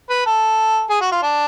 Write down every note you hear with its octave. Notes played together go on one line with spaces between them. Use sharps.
B4
A4
G#4
F#4
F4
D4